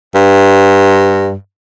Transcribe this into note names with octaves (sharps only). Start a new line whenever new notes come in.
G2